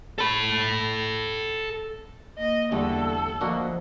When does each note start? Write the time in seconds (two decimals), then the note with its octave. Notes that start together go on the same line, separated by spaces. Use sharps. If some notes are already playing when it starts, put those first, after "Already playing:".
0.18 A4 B5
2.38 A#3 D#5
2.72 E2 D3 G3 A3 A4
3.41 D2 F3 A#3 D4 F#4 D#5